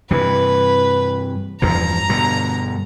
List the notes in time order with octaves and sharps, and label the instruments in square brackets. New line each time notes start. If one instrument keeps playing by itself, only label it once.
[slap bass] G2 C3 E3 [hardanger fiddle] B4
[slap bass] E2 G2 F3 [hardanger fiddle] A#5
[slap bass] G2 B2 D3